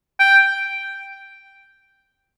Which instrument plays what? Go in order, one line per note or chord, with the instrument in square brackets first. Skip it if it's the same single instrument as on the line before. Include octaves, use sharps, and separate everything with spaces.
[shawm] G5